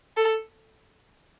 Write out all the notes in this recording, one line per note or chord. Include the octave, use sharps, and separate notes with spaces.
A4